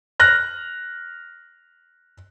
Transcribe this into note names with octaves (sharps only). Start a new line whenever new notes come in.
F6 F#6 A#6